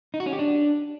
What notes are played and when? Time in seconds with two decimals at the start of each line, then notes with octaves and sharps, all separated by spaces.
0.14 D#4
0.20 F#4
0.26 C#4
0.33 G4
0.39 D4